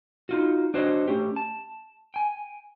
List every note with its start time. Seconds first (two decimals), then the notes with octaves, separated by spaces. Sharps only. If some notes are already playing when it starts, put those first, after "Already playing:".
0.29 D#4 F4 F#4
0.74 D4 F#4 C5 C#5 D#5
1.08 A3 C#4 G4
1.36 A5
2.14 G5 G#5